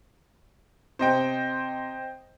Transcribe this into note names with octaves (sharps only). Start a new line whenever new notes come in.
C3 C5 D#5 G5